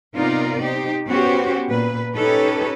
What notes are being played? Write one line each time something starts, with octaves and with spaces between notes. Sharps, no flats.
C3 B3 D#4 F4 A#4 D5
D#4 G4 C5
B3 C#4 F#4 G4 B4 C5
A#2 B4
C#4 D#4 G4 A4 B4 C#5